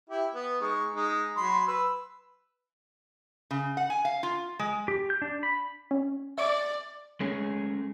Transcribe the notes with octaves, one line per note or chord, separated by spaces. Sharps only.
E4 G4
B3
G#3 D#4 C#6
G#3 D#4
F#3 B5 C6
B4 E6
C#3
F#5
G#5
F5
F4
G#3
G4
G6
D4
B5
C#4
D5 E5 C#6 D7
G#3 A3 C#4 G#4